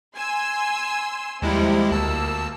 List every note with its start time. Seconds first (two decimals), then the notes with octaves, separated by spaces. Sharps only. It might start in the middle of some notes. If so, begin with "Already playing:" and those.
0.16 G#5 C6 E6
1.42 D#2 C3 F3 G3 G#3 E4
1.91 D2 A#3 A5 E6